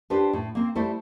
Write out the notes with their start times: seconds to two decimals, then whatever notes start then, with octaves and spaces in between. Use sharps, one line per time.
0.10 D4 F4 G4 B4 C5
0.33 A2
0.55 A#3 C4
0.75 G3 A3 E4 C5